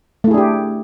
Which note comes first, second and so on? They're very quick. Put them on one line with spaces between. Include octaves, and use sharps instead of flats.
A3 E4 G#4 D4 G4